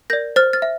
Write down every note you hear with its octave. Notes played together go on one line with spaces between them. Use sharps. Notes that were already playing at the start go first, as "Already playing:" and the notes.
A#4 D5 G6 A#6
C5 F6 A6
F6 A6
E5